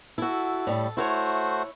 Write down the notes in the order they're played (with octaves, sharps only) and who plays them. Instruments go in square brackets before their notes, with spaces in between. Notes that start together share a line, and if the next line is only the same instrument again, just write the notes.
[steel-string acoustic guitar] E4 F#4 [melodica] A4
[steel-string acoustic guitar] A2 G3
[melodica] A3 F#4 C5 [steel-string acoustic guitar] E4 A4 C#5